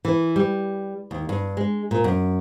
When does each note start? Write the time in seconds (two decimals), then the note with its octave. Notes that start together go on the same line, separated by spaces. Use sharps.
0.05 E3
0.36 G3
1.11 D#2
1.29 G2
1.57 G#3
1.91 A#2
2.04 F#2